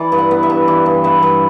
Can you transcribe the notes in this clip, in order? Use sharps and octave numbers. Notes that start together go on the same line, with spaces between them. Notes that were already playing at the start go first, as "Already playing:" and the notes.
Already playing: E3 D5
G2
F#5
B3
E5
G2
E3 D5
G2
B3 E5
G2